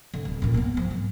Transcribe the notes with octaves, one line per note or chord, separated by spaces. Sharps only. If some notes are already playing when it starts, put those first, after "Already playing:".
D3
D1
F#2 A#2
A#3 B3
F3 F#3
G#1